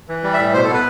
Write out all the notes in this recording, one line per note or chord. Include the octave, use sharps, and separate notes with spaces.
E3
G3
E5
A2
B2 C5
A4
B3 B4